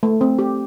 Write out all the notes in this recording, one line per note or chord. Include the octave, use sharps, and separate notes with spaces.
A3
C4
G4